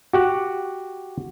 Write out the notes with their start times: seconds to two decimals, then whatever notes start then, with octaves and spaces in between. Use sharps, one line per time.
0.13 F#4 G4 F#5